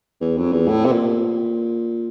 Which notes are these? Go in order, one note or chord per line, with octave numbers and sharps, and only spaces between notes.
E2
F2
E2
A2
C3
A#2